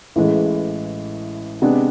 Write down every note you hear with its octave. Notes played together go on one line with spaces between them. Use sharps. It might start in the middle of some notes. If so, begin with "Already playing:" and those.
A1 A2 E3 G#3
C3 G#3 B3 D4 G#4